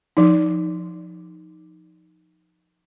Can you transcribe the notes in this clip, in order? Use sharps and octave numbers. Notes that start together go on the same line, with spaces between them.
F3 D#4